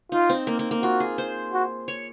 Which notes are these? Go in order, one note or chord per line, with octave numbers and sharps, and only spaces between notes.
D#4 F4
C4
A#3
A#3
A#3
F4 F#4
G#4
C5
F#4
C#5